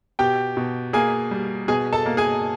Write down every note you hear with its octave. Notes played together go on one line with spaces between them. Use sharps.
B2 G4 G5
B2
A#3 G#4 G#5
G3
B2 G#4 G#5
A4 A5
A#3
G#4 G#5